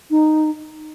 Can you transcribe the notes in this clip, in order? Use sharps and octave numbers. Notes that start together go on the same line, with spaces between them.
D#4